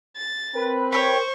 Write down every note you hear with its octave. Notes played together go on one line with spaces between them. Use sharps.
A6
C4 A#4 B4
G4 A4 C5 C#5 C#6